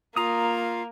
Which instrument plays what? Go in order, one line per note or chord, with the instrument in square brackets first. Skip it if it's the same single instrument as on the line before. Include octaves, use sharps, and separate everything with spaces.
[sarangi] A#3 [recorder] F4 [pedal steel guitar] A#5 D#6